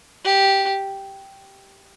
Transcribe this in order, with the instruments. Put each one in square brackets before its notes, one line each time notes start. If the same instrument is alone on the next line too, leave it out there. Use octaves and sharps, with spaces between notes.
[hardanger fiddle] G4